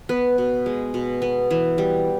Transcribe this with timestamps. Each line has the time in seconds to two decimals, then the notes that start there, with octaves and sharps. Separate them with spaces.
0.09 B3 B4
0.38 B2
0.66 G#3
0.94 B2
1.22 B3
1.51 E3
1.78 G3